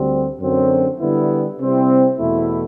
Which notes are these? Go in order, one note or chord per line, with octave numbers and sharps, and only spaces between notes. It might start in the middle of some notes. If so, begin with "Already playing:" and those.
Already playing: D2 D3 G3 C4
F#2 D3 F#3 C4
D3 G3 B3 E4
C3 G3 C4 E4
E2 B2 A3 E4